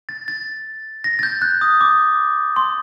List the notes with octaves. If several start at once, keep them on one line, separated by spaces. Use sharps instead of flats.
A6
A6
A#6
A6
G6
F#6
D#6
D6
C6